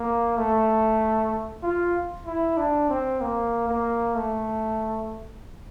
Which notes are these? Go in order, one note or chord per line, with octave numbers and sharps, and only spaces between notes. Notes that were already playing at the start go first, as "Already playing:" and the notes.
Already playing: A#3
A3
F4
E4
D4
C4
A#3
A#3
A3